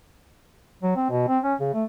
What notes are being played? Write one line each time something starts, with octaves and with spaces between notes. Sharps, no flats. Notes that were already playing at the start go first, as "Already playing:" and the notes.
F#3
C4
B2
C4
C#4
C#3
A3